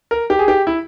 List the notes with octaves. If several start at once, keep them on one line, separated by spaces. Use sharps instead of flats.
A#4
G4
G#4
G4
E4